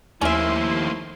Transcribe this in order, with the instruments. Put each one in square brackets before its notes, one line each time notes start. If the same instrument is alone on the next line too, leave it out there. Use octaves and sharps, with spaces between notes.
[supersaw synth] D#2 C6 [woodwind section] F3 E4 [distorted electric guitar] A3 A#3 [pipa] C#4 E5